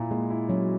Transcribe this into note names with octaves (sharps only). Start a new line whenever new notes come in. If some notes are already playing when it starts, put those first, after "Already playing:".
Already playing: A#2 E4
G#3 A#3
E4
F#3 C#4